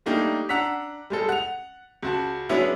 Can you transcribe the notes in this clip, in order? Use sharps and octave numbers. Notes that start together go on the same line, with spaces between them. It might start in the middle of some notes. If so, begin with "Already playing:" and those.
G3 A3 A#3 D4 D#4 G4
D4 F#5 A#5 E6 B6 F7
G3 G#3 A4
F#5 F7
C#2 F#4 A5
F#3 G#3 B3 C#4 D4 E4